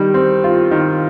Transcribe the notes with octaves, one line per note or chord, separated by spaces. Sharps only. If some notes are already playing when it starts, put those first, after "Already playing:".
Already playing: D#3 G3
C4
F4
D#3